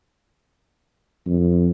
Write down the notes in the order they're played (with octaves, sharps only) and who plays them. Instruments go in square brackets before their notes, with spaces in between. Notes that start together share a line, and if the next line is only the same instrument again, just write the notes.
[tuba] F2